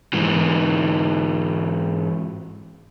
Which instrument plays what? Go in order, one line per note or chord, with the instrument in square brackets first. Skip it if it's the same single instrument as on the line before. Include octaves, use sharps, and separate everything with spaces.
[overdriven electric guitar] G#2 E3